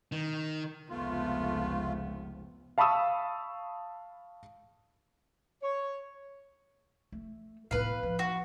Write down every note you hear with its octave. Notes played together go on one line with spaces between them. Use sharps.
D#3
F1 C#2 A3 B3 F4
F5 A5 B5 C#6 D#6 E6
C#5
A3
A2 B3 B4 F5
F3
F#4